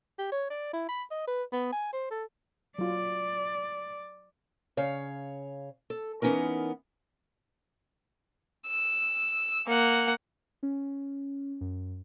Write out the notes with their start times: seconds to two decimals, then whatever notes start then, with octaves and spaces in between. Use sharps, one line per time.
0.19 G4
0.32 C#5
0.50 D5
0.73 E4
0.89 B5
1.11 D#5
1.27 B4
1.53 B3
1.72 G#5
1.93 C5
2.11 A4
2.78 F#3 F4 D5
4.77 C#3 C#5 F5
5.90 A4
6.22 E3 B3 C#4 D#4 A#4
8.68 E6
9.67 A#3 F#5
10.63 C#4
11.61 F#2